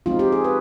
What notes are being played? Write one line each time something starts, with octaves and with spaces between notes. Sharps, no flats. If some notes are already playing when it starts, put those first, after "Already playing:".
F3 G#3 C4 D#4 F4
G4
G#4
B4